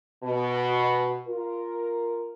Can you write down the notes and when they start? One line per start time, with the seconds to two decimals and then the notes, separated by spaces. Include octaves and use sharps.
0.24 B2
1.27 F4 A#4